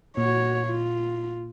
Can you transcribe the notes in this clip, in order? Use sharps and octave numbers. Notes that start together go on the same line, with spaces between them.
A#2 F#4 C#5
F4